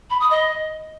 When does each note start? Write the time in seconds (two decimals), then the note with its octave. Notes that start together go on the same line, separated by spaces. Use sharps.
0.10 B5
0.20 D#6
0.30 D#5